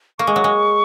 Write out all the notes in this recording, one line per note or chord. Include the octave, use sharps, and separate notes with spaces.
A#3 C#6
G#3
F#3
G#3